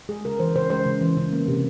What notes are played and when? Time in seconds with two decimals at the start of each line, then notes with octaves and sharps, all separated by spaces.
0.09 G#3 G#4
0.25 C#3 A#4
0.39 E3 C5
0.56 C#3 C5
0.70 G#3 C5
0.86 C#3
1.01 E3
1.17 C#3
1.33 A#3
1.48 C3